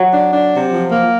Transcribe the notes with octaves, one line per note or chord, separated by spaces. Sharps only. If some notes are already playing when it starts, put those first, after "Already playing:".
Already playing: F#3
D4
D4
C3
F3
A#3